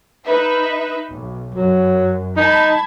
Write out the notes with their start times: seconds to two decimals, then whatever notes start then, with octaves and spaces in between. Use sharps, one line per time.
0.25 D#4 B4 E5
1.10 B1
1.55 F#2 F#3
2.37 D#4 A5 B5 G#6